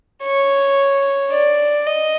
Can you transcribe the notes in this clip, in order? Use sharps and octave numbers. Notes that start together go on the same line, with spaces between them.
C#5
D5
D#5